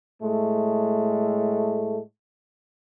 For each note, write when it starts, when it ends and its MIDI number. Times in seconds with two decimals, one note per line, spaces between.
0.22 2.00 45
0.22 2.00 56
0.22 2.00 57